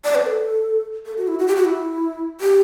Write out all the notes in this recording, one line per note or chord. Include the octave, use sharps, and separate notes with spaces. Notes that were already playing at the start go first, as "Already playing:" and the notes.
D5
B4
A4
A4
F#4
E4
F#4
G4
F#4
E4
G4